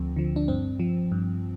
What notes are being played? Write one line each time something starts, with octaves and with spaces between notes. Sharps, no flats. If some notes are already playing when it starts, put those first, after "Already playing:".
Already playing: D2 D3 F3 C4
D3 F3
D4
G2 C4
F3
G2